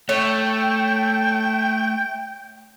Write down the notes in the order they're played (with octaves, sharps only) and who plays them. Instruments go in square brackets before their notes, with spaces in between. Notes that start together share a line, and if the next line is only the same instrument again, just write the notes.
[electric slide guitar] A3 [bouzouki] C#5 [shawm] G5